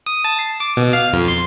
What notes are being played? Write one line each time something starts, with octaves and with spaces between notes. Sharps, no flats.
D#6
A5
C7
D6
B2
F5
F2
C6